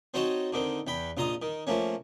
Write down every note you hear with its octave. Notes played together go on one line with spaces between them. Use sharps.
C4 D#4 F#4 C#5 D#5 A5
D3 D#3 C4
E2 G5 B5
A#1 F4 D#5 A#5 D#6
D#3
F3 A3 A#3 C#4